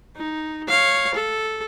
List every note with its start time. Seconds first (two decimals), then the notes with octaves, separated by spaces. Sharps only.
0.16 D#4
0.68 C#5 F5
1.14 A4